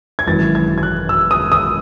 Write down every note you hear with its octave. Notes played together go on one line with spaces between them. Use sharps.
G#6
G#1 F#2 E3 A6
G#6
G#6
F#6
E6
D#6
D#6